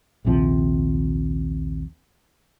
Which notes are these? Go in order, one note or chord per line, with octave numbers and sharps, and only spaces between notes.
A#1 D#2 C3 F3